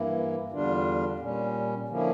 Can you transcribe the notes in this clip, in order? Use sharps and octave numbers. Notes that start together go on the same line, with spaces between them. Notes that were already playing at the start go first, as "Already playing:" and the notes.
Already playing: G2 E3 A#3 E4
E2 D3 G3 D4 F4
A#2 G3 C#4
D3 F3 A#3 C#4 E4